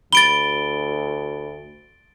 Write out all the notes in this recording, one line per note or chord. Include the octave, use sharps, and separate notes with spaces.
D2 B5 A6 D7 G7